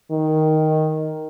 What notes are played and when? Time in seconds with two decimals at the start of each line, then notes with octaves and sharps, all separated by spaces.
0.11 D#3